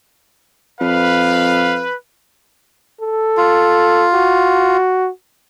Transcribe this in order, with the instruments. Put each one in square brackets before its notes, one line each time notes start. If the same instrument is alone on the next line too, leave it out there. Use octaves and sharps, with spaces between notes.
[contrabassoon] F2 [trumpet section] B4 [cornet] F5
[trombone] A4
[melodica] F4
[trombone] F#4